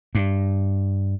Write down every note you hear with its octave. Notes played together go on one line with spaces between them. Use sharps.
G2